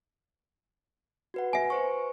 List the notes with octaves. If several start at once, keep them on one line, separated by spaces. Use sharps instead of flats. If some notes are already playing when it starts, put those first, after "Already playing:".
F#4 B4 F#5
E5 G#5
B4 C5 C#6